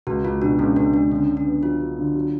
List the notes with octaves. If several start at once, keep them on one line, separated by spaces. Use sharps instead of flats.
C#2 F#4
C#2 F4
B2 D4
C#2 C#4
C#2 D4
C#2 D4
D3 C#4
D3
D4
B3
F#3 F4
F#3
D3
F#3